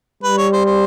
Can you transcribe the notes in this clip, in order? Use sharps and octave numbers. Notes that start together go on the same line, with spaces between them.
G3 B4
C#5
C5
C5